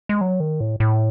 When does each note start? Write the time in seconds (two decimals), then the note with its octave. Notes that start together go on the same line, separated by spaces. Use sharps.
0.09 G#3
0.21 F#3
0.40 D#3
0.60 A2
0.80 A2